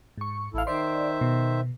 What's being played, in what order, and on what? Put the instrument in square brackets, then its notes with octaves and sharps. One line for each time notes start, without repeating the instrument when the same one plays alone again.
[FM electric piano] G#2 C#6
[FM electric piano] A1 F5 [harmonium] E4 A4
[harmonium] D#3 C5 E5 [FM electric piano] D5 C6
[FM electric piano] B2